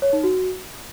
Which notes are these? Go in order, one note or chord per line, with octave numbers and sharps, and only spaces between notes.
C#5
D#4
F#4